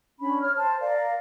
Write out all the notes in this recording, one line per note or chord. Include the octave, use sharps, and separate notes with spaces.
C#4 D4 B5
C#5 F6
C5 A5
A#4 D5 F5